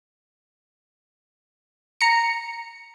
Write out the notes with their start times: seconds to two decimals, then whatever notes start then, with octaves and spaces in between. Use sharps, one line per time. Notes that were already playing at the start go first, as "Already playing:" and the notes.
2.01 A#5 C#7